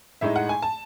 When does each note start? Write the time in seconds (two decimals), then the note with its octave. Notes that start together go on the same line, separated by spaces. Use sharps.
0.21 A2 G#3 D#4 E5
0.36 F#5
0.49 G#5
0.62 A5